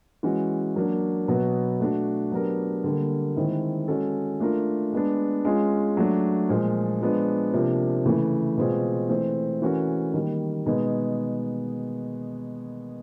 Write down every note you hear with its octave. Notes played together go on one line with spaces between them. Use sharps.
E3 G#3 C#4 F#4
F#3 A#3 D4
B2 F#3 B3
A3 D4 F#4
F#3 B3 D4 G4 A#4
D3 G3 A#3
D#3 G#3 C4 E4
G#3 C#4 F#4 A4
A3 D4 F4 A#4
G#3 B3 D4
G#3 C#4 F4 G#4
F#3 A3 D4
A#2 F3 G#3
F3 G#3 B3 D4
C3 F3 A#3 D4
C#3 E3 A3
B2 G#3 C4 F4 G#4
E3 A3 C4
E3 A3 C#4 F#4 A#4
D#3 G3 A#3
B2 G#3 B3 D#4 G#4